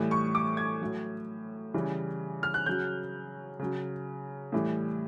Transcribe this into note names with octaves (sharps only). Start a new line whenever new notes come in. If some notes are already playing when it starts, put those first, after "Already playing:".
Already playing: A2 E3 G3
C#6
D6
G#6
A2 F#3
C#3 E3 G3
F6
F#6
C#3 F#3 G6
C#3 F#3
A2 E3 G3